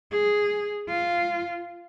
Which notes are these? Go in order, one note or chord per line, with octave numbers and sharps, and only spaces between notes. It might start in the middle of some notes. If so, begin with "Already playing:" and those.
G#4
F4